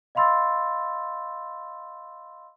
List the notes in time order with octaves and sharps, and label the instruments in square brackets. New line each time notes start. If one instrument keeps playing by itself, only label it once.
[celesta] D#5 F5 B5 C6 E6 A6